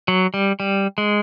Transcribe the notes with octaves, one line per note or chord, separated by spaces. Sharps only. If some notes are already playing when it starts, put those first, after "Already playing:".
F#3
G3
G3
G#3